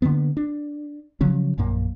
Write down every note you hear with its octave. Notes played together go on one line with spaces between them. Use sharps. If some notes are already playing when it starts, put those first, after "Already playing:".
D3 F#3 A#3 B3
D4
C#3 F3 F#3 C#4
A#1 F#2 A#2 A#3